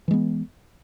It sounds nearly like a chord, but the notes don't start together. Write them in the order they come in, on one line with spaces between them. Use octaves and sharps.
E3 G#3 B3